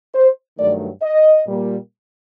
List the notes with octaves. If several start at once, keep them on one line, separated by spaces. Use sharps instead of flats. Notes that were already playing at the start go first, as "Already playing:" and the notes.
C5
G2 D#3 F#3 A3 D5
D#5
A#2 G3 A#3